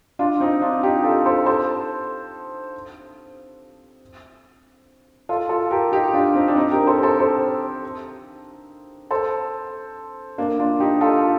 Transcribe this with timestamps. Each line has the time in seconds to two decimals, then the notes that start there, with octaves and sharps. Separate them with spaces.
0.19 D4 F4
0.40 C4 D#4
0.62 D4 F4
0.83 D#4 G4
1.04 F4 A4
1.26 A4 C5
1.46 A4 C5
5.29 F4 A4
5.49 F4 A4
5.71 G4 A#4
5.92 D#4 G4
6.14 D4 F4
6.35 C4 D#4
6.48 D4
6.56 C4 D#4
6.71 G4 A#4
6.87 A4 C5
7.03 A4 C5
7.19 A4 C5
9.11 A4 C5
10.38 A#3 D4
10.59 D4 F4
10.80 D#4 G4
11.01 F4 A4